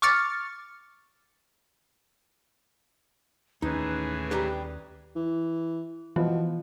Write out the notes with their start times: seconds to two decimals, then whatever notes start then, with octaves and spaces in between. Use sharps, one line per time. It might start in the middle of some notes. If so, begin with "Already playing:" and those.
0.02 C#6 D6 F6 A6 C#7
3.62 D#2 A2 E3 C#4 D#4 G#4 B4
4.31 G3 G4 A#5
5.15 E3
6.16 B2 E3 F3